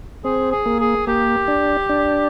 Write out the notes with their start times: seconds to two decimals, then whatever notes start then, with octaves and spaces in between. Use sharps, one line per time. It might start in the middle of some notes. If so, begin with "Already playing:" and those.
0.24 C4 G#4
0.52 G#4
0.66 A#3
0.80 G#4
1.07 A#3 G4
1.48 D4
1.89 D4